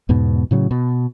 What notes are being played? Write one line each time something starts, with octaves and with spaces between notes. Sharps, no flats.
E2 G#2 B2
A2 C#3 F#3
B2